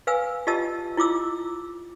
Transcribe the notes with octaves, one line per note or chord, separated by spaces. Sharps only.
B4 F5 G#5 E6
F4 G4 D#5 A5 E6
E4 F4 D6 E6